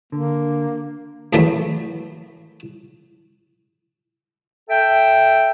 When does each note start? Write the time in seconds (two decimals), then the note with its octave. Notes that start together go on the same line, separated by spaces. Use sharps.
0.12 D3 A#3
1.33 C#2 A2 E3 F#3 A3
4.69 A4 E5 G5